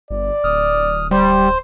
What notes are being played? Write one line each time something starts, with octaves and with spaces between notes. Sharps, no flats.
G1 D5
D1 D#6 F6
G3 C5